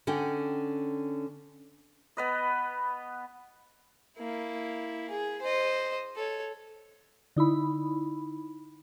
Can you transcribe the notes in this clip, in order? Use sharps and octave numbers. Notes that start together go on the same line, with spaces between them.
D3 C#4 F#5 G5
B3 B4 D#5
A#3 E4
G#4
C5 D#5
A4 C#5
D3 D#4 E4 B5